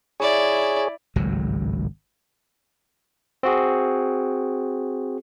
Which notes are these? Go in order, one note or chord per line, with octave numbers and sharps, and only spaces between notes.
E4 G#4 C#5 D5
G#1 C#2 A2 F#3
C4 F#4 G#4